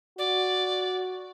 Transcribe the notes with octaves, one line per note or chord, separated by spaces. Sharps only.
F#4 D5